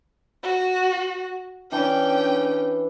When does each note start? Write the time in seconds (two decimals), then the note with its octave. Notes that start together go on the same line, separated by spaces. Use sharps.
0.43 F#4
1.72 E3 C#4 D4 G5